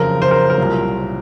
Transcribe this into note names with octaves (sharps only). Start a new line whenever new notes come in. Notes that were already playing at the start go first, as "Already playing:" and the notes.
Already playing: F#1 F2 C#3 A#4
C5
A#4
A#4
C2 A#2 F#3